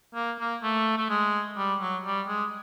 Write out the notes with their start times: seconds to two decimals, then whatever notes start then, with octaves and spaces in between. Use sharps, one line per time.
0.15 A#3
0.40 A#3
0.63 A3
0.97 A3
1.09 G#3
1.58 G3
1.81 F#3
2.05 G3
2.28 G#3